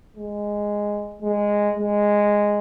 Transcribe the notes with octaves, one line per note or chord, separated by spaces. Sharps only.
G#3
G#3
G#3